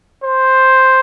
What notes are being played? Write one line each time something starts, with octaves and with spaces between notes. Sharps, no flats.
C5